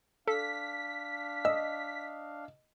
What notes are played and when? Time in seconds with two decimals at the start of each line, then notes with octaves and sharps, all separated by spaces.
0.28 D4 A4 F5 B6
1.45 D#5 E6